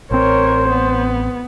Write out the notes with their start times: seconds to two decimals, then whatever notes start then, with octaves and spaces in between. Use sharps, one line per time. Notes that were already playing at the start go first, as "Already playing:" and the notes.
0.11 A1 C4 A#4 C5 C#5
0.69 B3